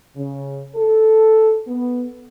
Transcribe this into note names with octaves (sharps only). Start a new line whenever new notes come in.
C#3
A4
B3